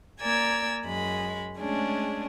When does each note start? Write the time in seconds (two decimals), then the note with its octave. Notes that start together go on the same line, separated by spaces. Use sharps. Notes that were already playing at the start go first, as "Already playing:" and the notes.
0.20 A#3 D5 G#5 A#5 E6 G#6
0.84 F#2 G#3 B5
1.59 G#3 A3 C#4 D4 G#4